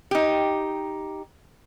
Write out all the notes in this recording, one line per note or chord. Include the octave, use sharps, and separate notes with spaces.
D#4 G4